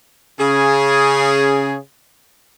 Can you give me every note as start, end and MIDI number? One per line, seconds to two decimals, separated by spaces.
0.39 1.76 49
0.39 1.76 68